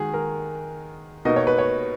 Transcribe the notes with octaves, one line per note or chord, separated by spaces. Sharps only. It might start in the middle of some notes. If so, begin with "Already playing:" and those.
Already playing: D#3 G#3 F#4 G#4
A#4
B2 A#3 D#4 D#5
C#5
B4
C#5